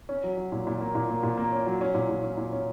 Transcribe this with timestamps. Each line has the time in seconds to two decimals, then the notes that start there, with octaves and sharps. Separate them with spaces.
0.09 C#4
0.24 F#3
0.37 F#3
0.52 A#2
0.67 A#2
0.81 A#3
0.95 A#2
1.09 A#3
1.23 A#2
1.37 A#3
1.53 C#4
1.67 F#3
1.81 C#4
1.95 A#2
2.09 A#2
2.24 C#4
2.38 A#2
2.53 C#4